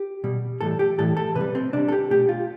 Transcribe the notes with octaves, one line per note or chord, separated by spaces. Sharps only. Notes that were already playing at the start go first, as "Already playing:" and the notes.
Already playing: G4
B2 G3
A2 E3 G3 A4
G4
A2 E3 G3 A4
A4
C3 B4
G3
C4
C3 G3 D4
A4
G4
B2 A3 G4
F4